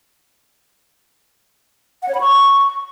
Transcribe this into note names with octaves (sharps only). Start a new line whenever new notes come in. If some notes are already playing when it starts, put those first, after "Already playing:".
F#5
C#5
B5
C#6